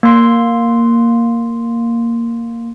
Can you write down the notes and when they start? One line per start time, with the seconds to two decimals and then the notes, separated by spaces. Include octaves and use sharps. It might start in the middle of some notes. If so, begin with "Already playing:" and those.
0.03 A#3 C6